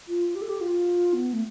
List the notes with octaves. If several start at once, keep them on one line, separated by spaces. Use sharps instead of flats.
F4
G4
A4
G4
F4
B3
A3